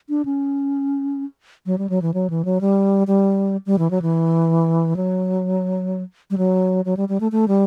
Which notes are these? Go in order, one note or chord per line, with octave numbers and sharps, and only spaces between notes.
D4
C#4
F#3
G3
F#3
E3
F#3
E3
F#3
G3
G3
G3
E3
F#3
E3
F#3
G3
F#3
F#3
G3
G3
A3
A3
G3